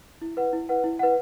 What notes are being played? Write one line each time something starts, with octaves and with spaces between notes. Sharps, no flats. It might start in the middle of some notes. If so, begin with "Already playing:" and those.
E4
B4 F#5
E4
B4 F#5
E4
B4 F#5